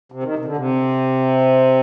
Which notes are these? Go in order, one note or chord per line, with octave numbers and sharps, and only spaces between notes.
C3
D#3
C3
D3
C3